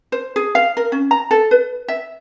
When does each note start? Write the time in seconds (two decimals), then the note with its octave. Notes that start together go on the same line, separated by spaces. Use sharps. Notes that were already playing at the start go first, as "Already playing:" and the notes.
0.12 C5
0.36 G#4
0.55 F5
0.77 A#4
0.92 C#4
1.11 A#5
1.31 A4
1.51 B4
1.88 E5